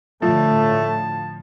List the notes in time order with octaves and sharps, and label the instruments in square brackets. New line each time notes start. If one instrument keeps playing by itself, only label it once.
[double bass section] A2 D3 [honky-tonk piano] F3 [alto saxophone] A3 [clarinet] A5